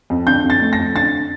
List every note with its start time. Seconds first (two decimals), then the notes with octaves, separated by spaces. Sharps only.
0.10 F2
0.27 D3 G6
0.44 F2
0.50 A6
0.61 A3
0.73 A#6
0.78 F2
0.95 D3 A6